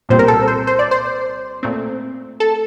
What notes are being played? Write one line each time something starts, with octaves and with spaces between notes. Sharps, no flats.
C2 A#2 G3 C4 C5
A#4
A4
C5
C5
D5
C5
A#2 A3 C4
A4